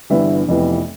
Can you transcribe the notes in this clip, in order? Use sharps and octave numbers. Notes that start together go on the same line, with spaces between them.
G1 G2 E3 B3 E5
F1 F2 C3 E3 B3